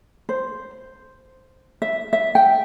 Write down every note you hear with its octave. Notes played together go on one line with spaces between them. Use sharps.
C5
E5
E5
G5